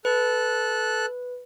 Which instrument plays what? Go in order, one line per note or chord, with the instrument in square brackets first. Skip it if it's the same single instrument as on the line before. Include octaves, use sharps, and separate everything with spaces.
[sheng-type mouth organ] A4 F#6 [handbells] B4